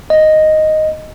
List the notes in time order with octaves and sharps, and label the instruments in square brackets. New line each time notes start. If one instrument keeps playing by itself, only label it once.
[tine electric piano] D#5